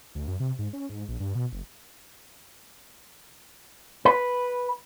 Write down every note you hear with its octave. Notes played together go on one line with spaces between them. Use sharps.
D2
F#2
C3
G#2
C#4
G#2
A#1
G2
B2
F#1
B4